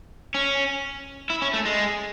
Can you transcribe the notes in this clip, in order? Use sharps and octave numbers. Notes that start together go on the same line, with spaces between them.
C#4
E4
C#4
A3
G#3